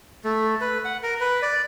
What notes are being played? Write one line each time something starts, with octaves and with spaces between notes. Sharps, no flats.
A3
B4
F#5
A#4
B4
D5